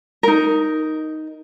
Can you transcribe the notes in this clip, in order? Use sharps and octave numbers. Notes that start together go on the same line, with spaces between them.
D#4 A#4